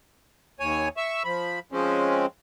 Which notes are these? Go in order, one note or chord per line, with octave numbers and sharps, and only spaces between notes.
D#2 C#5 G#5
E5 C#6 E6
F3 B5
F3 G#3 C4 C#4